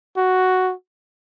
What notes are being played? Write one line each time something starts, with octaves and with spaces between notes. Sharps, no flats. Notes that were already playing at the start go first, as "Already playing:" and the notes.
F#4